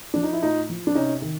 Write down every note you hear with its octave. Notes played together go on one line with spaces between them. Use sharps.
F3 D4
D#4
E4
A2 D#4 F4
F3
D4
C3 C#4 D#4
D#3